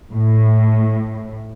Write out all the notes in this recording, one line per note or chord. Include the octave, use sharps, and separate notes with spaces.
A2